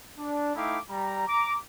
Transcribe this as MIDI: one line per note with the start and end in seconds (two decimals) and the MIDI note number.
0.18 0.54 62
0.56 0.78 57
0.56 0.78 63
0.56 0.78 64
0.56 0.78 77
0.56 0.78 79
0.56 0.78 86
0.90 1.26 55
0.90 1.26 82
1.28 1.56 82
1.28 1.56 86